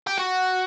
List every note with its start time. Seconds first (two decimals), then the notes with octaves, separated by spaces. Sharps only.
0.07 G4
0.18 F#4